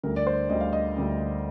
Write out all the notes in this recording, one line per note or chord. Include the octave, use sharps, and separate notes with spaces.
D2 D3 G3 A#4
D5
C5
D2 D3 G3 D#5
F5
D#5
D2 D3 G3